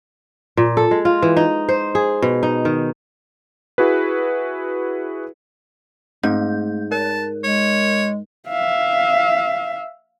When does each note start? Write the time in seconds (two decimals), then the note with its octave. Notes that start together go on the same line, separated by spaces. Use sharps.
0.57 A#2
0.77 A4
0.91 G#3
1.05 F4
1.22 E3
1.37 D#4
1.69 C5
1.95 G#4
2.22 B2
2.43 D#4
2.65 D#3
3.78 E4 F#4 G#4 B4
6.23 G#2 A3 G6
6.92 A#4 A5
7.44 G#3 C#5
8.49 E5 F5